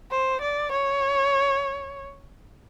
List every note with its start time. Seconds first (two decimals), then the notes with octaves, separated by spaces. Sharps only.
0.11 C5
0.42 D5
0.72 C#5